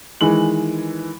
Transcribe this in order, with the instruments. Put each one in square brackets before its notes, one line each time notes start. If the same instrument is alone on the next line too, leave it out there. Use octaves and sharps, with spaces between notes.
[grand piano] D#3 E3 G#3 F#7